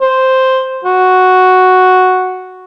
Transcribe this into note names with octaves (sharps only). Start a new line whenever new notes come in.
C5
F#4